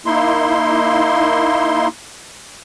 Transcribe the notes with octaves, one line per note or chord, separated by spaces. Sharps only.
A#3 D#4 E4 C6